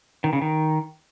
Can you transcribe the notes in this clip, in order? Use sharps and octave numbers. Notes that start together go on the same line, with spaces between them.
D#3
C#3
D#3